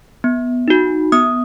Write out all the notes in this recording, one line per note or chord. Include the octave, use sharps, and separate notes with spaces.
B3
D#4 F#4
B3 D#6